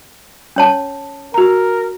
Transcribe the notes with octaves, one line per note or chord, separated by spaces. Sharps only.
C#4 C#5 A5
F#4 A#4 A#5